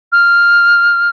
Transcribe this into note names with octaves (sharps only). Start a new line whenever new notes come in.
F6